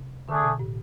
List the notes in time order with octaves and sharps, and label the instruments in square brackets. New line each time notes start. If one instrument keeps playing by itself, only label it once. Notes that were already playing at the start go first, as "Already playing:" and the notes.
Already playing: [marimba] C3
[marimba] D3 [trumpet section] A3 D4 G#4
[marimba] B2
A2